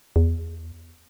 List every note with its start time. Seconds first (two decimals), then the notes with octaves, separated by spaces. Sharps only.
0.16 E2